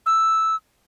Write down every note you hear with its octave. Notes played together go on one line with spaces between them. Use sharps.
E6